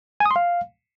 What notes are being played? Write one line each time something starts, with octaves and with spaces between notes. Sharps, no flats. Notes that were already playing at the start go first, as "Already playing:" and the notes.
G#5
D#6
C6
F5